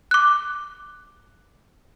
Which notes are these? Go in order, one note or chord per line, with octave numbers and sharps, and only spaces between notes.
D6 F#6